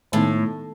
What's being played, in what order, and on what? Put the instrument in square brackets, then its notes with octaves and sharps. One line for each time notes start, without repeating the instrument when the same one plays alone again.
[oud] A2 [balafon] D#3 G#3 B3 D#4